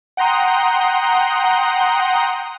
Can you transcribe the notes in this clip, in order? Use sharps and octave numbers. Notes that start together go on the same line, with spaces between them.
F#5 G5 A#5 C6 D#6